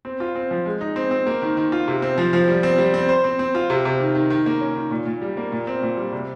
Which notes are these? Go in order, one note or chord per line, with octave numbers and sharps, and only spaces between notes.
C4
F4
C4
F3
G#3
D#4
C4
C4
A#3
D#3
D#3
F4
C3
C4
F3
F3
G3
C4
G3
C4
C5
C4
C4
F4
C3
C3
D#3
D#3
D#3
A#3
C#4
D#3
A#2
A#2
G3
A#3
A#2
C4
A#2
G3
C3